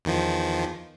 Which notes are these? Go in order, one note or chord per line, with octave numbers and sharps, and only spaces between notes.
E2 D#3 F3